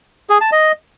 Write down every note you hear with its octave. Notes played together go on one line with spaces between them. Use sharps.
G#4
A5
D#5